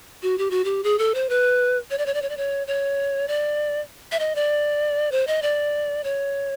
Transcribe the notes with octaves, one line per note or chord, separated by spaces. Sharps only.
F#4
G4
F#4
G4
G#4
A4
C5
B4
C#5
D5
C#5
D5
C#5
D5
C#5
C#5
D5
E5
D#5
D5
C5
D#5
D5
C#5